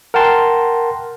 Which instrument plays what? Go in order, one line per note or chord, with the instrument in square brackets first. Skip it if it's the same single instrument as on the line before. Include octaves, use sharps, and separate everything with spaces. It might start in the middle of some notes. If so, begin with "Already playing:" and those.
[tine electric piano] A#4 F#5 G5 A5 C6